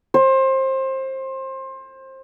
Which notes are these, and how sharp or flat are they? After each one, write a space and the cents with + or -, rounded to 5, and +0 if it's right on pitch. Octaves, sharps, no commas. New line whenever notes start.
C5 +25